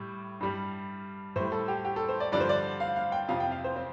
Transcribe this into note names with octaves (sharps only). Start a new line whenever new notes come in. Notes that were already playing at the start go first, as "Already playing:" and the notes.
Already playing: A2 G3
G2 G3
A2 G3 C5
A4
G4
G4
A4
C5
D5
G2 D3 F3 D5
C5
D5
F5
F5
G5
F2 C3 F3 F5
G5
F5
C5
C4